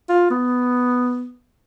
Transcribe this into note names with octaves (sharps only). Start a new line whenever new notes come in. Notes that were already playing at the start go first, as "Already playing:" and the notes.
F4
B3